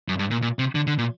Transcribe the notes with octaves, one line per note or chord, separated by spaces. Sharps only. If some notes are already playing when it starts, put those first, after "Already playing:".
F#2
G2
A#2
A#2
C3
D3
D3
A#2